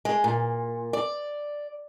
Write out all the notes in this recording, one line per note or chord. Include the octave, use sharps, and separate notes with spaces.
G#3
A#2
D5